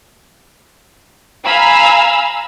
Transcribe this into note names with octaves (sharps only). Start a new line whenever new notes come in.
F5 G#5 A#5 B5 E6